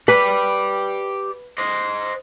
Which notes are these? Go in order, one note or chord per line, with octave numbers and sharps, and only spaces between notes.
G4 B4 D5
C5 D#5